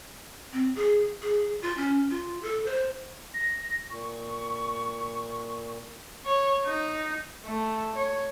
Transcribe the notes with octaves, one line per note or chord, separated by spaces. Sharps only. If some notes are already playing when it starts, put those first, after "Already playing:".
C4
G#4
G#4
F4
C#4
F4
A4
C5
A#6
A#2 C#6
C#5
D#4
A3
C#5